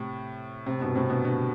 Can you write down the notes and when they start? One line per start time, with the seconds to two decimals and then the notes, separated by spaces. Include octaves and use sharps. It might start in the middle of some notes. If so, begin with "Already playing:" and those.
Already playing: A2 C3
0.66 A2 C3
0.80 G2 B2
0.95 A2 C3
1.10 B2 D3
1.24 B2 D3